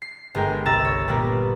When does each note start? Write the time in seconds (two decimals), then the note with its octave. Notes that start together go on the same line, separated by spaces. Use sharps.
0.02 C7
0.35 G1 G#3 A#4 G5
0.66 C2 A#5 E6 A6
0.85 C#5
1.08 A#2 G3 A#3 B3 A#4